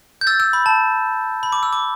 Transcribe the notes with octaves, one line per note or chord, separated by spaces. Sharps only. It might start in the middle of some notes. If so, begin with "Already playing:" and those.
G6
E6 A6
E6
B5
A5
B5
D6
E6
D6